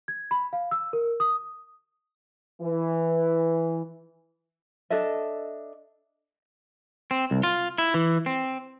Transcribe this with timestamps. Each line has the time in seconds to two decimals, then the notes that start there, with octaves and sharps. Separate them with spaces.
0.08 G#6
0.31 B5
0.53 F5
0.71 E6
0.93 A#4
1.20 D#6
2.62 E3
4.90 D4 A4 D#5 E5
7.11 C4
7.31 C2
7.43 F4
7.78 E4
7.94 E3
8.26 C4